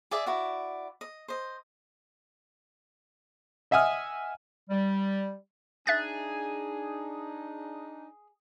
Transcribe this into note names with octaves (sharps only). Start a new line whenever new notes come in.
G#4 D5 E5
E4 F#4 D5
D#5
C5 D#5
D#5 E5 F#5 G#5 D#6 F6
G3
D4 D#4 G#4 E5 F#6 A6